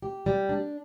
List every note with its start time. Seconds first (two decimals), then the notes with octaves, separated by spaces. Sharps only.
0.02 G4
0.26 G3
0.49 D4